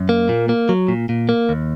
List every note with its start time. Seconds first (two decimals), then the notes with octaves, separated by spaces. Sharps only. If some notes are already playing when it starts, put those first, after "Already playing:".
Already playing: F#2
0.09 A#3
0.29 A#2
0.49 A#3
0.69 F#3
0.88 A#2
1.09 A#2
1.29 A#3
1.49 D#2